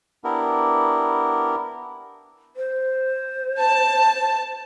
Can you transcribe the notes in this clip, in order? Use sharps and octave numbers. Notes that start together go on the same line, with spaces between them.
B3 D4 E4 G4 A#4
C5
A5